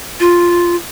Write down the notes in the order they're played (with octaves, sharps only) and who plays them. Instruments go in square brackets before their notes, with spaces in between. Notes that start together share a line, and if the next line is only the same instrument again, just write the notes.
[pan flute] F4